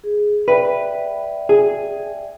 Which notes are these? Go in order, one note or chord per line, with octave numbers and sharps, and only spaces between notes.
G#4
B4 D5 E5 G5
G#4